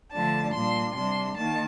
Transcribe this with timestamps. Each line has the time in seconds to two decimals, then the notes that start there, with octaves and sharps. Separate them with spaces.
0.12 D3 F3 A3 D4 A5
0.53 A#2 G3 D4 C6
0.95 C3 G3 D4 C6
1.35 D#3 A#3 A5